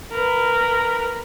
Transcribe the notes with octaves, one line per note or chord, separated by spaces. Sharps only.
A#4 B4